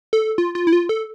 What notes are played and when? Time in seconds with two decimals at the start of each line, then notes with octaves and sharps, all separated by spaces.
0.13 A4
0.38 F4
0.55 F4
0.67 E4
0.73 F4
0.89 A4